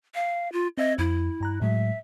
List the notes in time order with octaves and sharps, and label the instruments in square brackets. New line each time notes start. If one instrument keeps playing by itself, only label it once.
[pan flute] F5
F4
[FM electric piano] C4 E5 G#6 [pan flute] D#5
[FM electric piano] F2 [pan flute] E4
[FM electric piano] G2 A#5 F#6
[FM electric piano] A2 F#3 G#3 [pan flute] E5